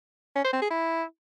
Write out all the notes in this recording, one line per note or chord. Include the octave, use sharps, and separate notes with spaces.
C#4
C5
C4
G#4
E4